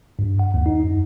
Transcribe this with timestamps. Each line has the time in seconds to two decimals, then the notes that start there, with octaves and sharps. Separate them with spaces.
0.19 G2
0.39 F#5
0.54 D#2
0.66 D#4
0.84 F#2